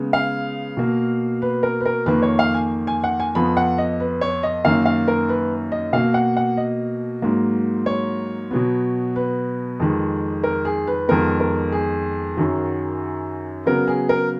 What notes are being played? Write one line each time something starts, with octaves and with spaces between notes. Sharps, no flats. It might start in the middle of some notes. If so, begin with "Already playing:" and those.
Already playing: C#3 G#3 B3
F5
B2 A#3
B4
A#4
B4
A#4
F2 D#3 A#3 B4
C#5
F5
G#5
G#5
F#5
G#5
F2 F3 B3 B5
F#5
D#5
B4
C#5
D#5
F#2 D#3 A#3 F5
F5
A#4
B4
D#5
B2 A#3 F5
F#5
F#5
D#5
G#2 F#3 A#3
C#5
B2 F#3 B3
B4
F2 D#3 G#3
A#4
G#4
B4
F2 D#3 G#3 B3 A#4
A#4
G#4
F#2 D#3 F#3
C#3 F#3 B3 A#4
G#4
A#4